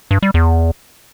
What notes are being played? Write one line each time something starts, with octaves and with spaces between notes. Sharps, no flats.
G2
G3
E2